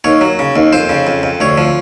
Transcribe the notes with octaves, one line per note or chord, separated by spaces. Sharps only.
D#2 C#5
F#3
C#3
D#2
F2 C5
C#3
F2
F2
D2 C#5
F3